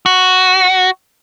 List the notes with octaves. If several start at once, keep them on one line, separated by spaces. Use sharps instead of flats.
F#4